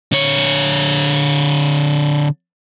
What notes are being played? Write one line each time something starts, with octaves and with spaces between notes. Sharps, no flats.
D3 C#5